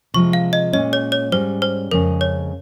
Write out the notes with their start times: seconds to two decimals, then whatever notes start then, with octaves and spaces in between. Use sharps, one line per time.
0.14 C3 F3 G#3 C#6
0.33 F5
0.53 D#5
0.73 A#2 G#3 C#4 D#5
0.93 C#5
1.12 C#5
1.32 G#2 G3 C#4 C5
1.62 C5
1.91 F2 C#3 G#3 C#4 A#4
2.21 C#5